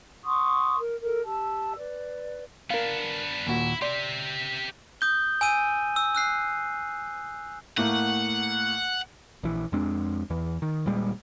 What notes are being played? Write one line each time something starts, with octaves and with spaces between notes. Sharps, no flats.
F#5 C6 C#6 D#6
A#4
A4 A#4
G4 A5 E6
B4 D5
B3 D4 A#4 F5
D#2 A#2 E4 F#4
G4 D5 E5 C6
D#6 G6 G7
G#5 E6 D#7
E6
E6 F#6 C7
A2 A3 A#3 F#5
A#1 E3
F2 G#3 C4 D4
E2 E3
D#3
D#1 A#2 G3 G#3